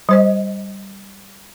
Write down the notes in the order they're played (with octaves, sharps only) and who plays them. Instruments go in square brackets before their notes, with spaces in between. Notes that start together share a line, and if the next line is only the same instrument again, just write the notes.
[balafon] G3 C5 D#5